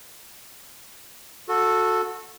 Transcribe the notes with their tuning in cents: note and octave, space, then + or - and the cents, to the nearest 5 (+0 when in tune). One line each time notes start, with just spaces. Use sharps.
F#4 -25 A4 +0